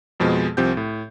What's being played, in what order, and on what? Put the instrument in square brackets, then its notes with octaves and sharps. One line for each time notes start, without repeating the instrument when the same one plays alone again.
[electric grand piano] F2 B2 F3 G#3
C2 F3 C4 G4 G6
A2